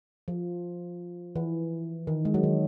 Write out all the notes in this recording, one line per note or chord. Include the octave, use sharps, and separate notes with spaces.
F3
E3
D#3
G#3
F#3
D#3